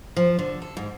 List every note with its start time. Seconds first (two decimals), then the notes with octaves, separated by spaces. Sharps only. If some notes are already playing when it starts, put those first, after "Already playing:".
0.17 F3
0.39 D3
0.62 A4
0.77 G#2